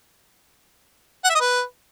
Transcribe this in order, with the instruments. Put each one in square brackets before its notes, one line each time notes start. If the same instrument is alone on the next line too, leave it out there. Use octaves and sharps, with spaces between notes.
[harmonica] F#5
E5
D#5
B4